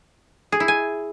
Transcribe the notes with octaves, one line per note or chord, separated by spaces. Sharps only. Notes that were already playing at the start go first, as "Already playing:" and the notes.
G#4
E4
G#5